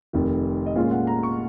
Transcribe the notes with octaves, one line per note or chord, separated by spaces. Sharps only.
F1 F2 D#3
D#5
A#2 G#3 C#4 F4 F5
F#5
A#5
C#6